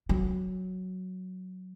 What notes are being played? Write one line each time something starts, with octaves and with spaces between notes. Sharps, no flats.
F#3